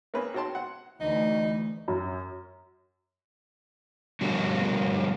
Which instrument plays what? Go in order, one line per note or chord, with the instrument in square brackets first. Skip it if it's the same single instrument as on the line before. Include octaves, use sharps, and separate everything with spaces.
[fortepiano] A#3 C4 G#4 B4 C#5
F#4 C#5 G5 A5 C6
F#5
[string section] D2 E3 [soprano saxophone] D#4
[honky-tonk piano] F#2
[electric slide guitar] D3 G3 A#3 F#4 G4